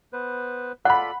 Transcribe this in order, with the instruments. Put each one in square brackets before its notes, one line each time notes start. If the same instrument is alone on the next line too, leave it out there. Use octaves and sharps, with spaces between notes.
[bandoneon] B3 B4 C5
[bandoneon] F4 A4 D5 [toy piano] F#5 [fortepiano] B5 F#6